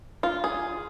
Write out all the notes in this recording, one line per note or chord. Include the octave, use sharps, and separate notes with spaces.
F4
G#4